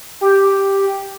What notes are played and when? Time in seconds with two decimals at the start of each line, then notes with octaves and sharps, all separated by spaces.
0.21 G4